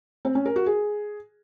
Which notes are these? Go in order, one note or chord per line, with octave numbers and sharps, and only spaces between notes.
C4
C#4
A#4
F#4
G#4